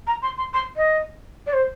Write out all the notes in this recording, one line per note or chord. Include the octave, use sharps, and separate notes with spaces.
A#5
C6
C6
C6
D#5
D5
C5